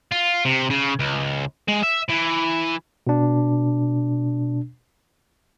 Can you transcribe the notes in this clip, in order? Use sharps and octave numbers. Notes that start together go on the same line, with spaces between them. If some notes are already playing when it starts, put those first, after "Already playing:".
F4
C3
C#3
C#2
G#3
E5
E3
B2 D4